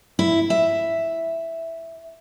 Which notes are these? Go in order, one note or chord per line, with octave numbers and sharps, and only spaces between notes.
E4
E5